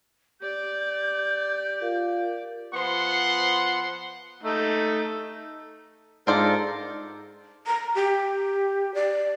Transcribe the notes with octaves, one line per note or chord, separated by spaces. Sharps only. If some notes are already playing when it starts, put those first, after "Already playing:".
G4 D5 G6
F4 A#4 F5
F3 B3 C5 F#5 C6
A3 D#4
G#2 D4 F4 A4 A#4 C5 D5
A#5
G4
D5